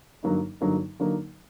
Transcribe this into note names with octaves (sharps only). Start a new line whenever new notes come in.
G2 D3 F#3 A#3 D#4
G2 D3 F#3 A#3 D#4
D3 F#3 A#3 D#4